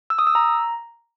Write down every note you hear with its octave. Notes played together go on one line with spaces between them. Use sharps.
E6
D#6
E6
A#5